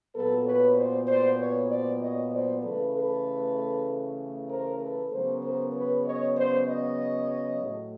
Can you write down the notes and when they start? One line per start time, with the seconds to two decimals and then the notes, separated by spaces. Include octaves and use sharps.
0.14 A#2 F#3 B3 A4 B4
0.45 B4 C#5
0.76 C5 D5
1.08 C5 D5
1.39 B4 C#5
1.70 C5 D5
2.01 C#5 D#5
2.32 C5 D5
2.63 C#3 E3 A3 A4 B4
2.94 A4 B4
4.50 A#4 C5
4.81 A4 B4
5.12 C#3 F#3 B3 A#4 C5
5.43 A#4 C5
5.74 B4 C#5
6.06 C#5 D#5
6.37 C5 D5
6.68 C#5 D#5
7.61 A2 F#3 A3